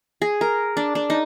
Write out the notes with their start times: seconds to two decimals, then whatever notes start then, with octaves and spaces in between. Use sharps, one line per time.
0.22 G#4
0.41 A#4
0.77 D4
0.95 D4
1.10 D#4